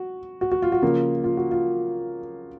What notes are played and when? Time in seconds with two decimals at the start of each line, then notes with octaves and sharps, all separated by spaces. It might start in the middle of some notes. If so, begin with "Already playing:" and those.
Already playing: F#4
0.41 F#4
0.52 F#4
0.62 F4
0.72 F#4
0.82 C#3 F3 A#3 F4
1.24 F4
1.37 F#4
1.51 F4